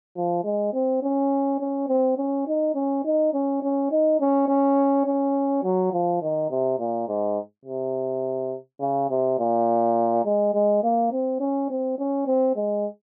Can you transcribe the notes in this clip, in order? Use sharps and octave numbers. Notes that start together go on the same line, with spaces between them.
F3
G#3
C4
C#4
C#4
C4
C#4
D#4
C#4
D#4
C#4
C#4
D#4
C#4
C#4
C#4
F#3
F3
D#3
C3
A#2
G#2
C3
C#3
C3
A#2
G#3
G#3
A#3
C4
C#4
C4
C#4
C4
G#3